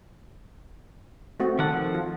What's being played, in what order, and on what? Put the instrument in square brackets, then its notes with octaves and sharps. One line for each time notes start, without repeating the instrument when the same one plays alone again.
[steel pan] A3 C4 F#4
[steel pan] D#3 A4 [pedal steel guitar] F3 F#5
[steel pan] F4